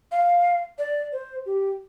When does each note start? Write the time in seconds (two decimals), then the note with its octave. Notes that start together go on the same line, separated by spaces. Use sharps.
0.12 F5
0.78 D5
1.12 C5
1.46 G4